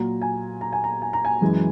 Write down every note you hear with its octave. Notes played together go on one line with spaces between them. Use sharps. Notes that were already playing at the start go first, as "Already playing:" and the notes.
Already playing: A#2 F#3 A#5
G#5
A#5
G#5
A#5
G#5
A#5
G#5
F#2 E3 G#3